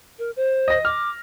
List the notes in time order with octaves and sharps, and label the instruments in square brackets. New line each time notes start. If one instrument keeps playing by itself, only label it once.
[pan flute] A#4
C5
[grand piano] D#5 A#6
[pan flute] D6 [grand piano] F6